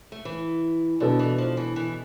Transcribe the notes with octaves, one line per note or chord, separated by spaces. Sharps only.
A3
E3
B2 D3 B3 D4 A4
E3
F3
E3
E3